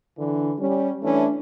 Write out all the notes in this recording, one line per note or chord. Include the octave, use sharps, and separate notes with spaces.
D3 E3
G3 C#4
E3 A3 C#4 D4